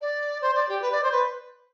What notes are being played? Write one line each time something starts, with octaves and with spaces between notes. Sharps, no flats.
D5
C5
D5
G4
B4
D5
C5
B4